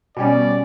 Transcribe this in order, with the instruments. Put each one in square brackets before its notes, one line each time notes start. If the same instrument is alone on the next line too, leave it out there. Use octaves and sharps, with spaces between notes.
[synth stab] B2 G3 C#4 [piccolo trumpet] D5